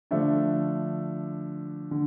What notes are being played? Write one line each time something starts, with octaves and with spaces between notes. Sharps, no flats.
D3 F3 A3 D4
D3